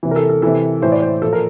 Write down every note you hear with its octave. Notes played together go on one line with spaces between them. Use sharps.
C3 E3
A#4
A4
A4
C3 E3 A4
A2 E3 C5
D5
C5
A#2 F3 A4
A#4